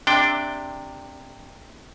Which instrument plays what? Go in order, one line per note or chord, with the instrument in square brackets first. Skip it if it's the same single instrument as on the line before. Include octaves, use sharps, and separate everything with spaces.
[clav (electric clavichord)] C3 D4 G5